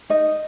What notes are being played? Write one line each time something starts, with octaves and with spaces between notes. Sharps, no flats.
D#4 D#5